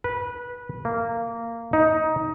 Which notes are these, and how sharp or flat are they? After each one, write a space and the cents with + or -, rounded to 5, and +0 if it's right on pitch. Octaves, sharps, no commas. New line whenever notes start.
B4 -20
A#3 -15
D#4 +15